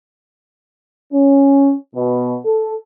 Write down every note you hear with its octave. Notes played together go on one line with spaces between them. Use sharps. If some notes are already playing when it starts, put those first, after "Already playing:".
C#4
B2
A4